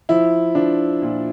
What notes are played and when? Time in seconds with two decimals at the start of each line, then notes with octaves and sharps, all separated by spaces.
0.09 F3 E4
0.55 F3 D4
1.02 A#2